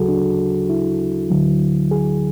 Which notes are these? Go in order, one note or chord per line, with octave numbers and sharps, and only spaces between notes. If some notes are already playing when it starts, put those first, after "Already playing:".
Already playing: D2 C#3 F#3 F#4 G#4 A4
D4
E4
D2 D3 F#3
G#4